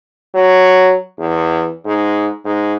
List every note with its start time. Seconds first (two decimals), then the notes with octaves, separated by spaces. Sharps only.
0.35 F#3
1.19 E2
1.85 G#2
2.44 G#2